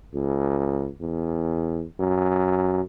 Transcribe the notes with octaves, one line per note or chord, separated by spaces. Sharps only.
C#2
E2
F#2